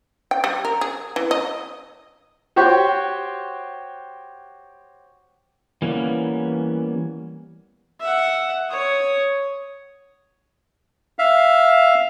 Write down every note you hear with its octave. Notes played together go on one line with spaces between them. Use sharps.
G5
G3
A#4
G#4
E3
D#5
F#4 G4 C5 C#5 G5
E3 G3 A#3 B3 C#4
E5 F#5
C#5 D#6
E5 F5